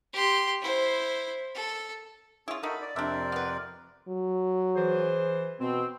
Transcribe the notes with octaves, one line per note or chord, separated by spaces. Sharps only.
G4 C6
E4 C5
A4
C#4 E4 F4 G#4
D#4 F#4 A4 A#4 B5
D5
F2 C3 D4 A#4 C5 D5 E5
B3 B4
F#3
E3 G#4 C5
B2 C4